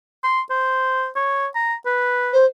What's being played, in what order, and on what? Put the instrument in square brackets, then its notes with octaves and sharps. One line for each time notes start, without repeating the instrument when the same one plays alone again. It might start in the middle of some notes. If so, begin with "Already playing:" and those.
[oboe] C6
C5
C#5
A#5
B4
[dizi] C5